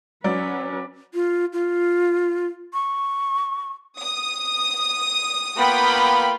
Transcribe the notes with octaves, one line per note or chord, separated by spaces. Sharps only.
F#3 C#4 B4 D5
F4
F4
C#6
D#6
A#3 B3 F4 G5 B5